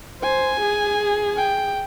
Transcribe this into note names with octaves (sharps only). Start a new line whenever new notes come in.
C5 G#5
G#4
G5